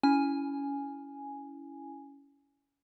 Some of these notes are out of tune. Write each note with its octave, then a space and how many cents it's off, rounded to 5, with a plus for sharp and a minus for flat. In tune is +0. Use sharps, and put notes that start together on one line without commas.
C#4 +20 E4 +0 G#5 +0